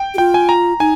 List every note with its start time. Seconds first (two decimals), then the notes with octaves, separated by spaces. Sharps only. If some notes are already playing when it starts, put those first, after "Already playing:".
Already playing: G5
0.14 G4
0.18 F4 G5
0.34 G#5
0.49 A#5
0.80 D#4 G#5